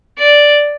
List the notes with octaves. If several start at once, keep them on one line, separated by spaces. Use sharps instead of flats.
D5